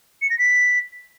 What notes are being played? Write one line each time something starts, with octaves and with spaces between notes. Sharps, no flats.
C#7
A#6
B6